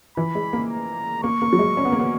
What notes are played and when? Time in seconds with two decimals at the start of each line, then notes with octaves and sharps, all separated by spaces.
0.17 E3 B5
0.35 G#3
0.53 A#3
0.70 A#5
1.23 A#3 C#6
1.42 A#3
1.53 F#3
1.59 G#3
1.77 C#4
1.85 B3
1.92 A#3
1.99 B3